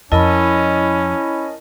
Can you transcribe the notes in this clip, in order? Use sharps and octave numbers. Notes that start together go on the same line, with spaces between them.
F2 C#4 E4 A#4 D#5 A5 B5